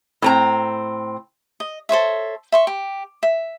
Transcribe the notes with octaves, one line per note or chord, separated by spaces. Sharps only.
A2 C4 A#5
D#5
A4 C5 C#5 E5
E5 C6 C#6
G4
E5